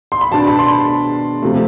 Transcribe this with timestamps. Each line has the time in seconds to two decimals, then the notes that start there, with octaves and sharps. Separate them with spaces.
0.12 C6
0.21 B5
0.32 B2 B3 D4 A5
0.47 B5
0.59 C6
1.42 C3 F3 A3